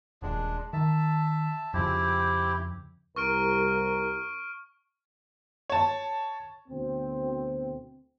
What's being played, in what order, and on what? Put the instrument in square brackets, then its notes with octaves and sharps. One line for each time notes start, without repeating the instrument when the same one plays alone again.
[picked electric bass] D#1 [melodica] G#3 D4
[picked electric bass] D#3 [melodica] E5 A5
[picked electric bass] F2 C#3 [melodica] C4 E4 G4
[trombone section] C2 A#4 [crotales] C#6 F6 D7
[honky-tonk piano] C#5 A5
[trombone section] D2 B2 C4